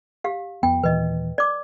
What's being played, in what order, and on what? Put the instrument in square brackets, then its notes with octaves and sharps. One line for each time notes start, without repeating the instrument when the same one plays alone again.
[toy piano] G4 F5
[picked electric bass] F2 B3 [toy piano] G5
[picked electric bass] D#1 A#2 E3 [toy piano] B4 D#5
[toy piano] D5 D6